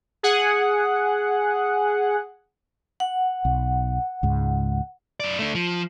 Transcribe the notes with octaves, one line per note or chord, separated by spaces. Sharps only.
G#4 F#5
F#5
B1
C#2 G#2
F#2 D5
A3 D4
F3